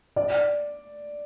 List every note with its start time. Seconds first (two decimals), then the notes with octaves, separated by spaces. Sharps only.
0.16 D5